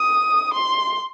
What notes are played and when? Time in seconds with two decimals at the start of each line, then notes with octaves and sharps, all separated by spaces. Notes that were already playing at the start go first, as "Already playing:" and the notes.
Already playing: D#6
0.54 C6